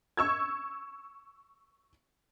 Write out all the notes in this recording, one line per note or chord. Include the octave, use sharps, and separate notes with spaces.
C#6 E6 G#6